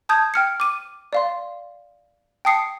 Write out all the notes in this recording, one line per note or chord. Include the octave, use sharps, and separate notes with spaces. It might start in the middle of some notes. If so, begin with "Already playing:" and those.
A5 D#6 G6 G#6
G5 F6 C#7
D6 D#7
D5 F5 C6
G5 A5 D#6 C7 C#7